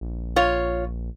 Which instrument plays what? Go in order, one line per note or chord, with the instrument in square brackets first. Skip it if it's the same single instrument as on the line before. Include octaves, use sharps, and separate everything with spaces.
[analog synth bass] A#1
[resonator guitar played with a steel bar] F4 C#5